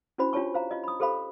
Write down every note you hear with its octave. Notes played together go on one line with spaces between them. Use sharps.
C#4 D4 E4 F#4 C5 B5
D4 F4 G4 C#5 A5 C#6
C5 F5 A#5
F4 D#5
B5 D#6
G4 A4 C5 F5 B5